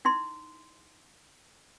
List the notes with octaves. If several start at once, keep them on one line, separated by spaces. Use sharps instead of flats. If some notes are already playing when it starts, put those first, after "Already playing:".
D#4 E4 C6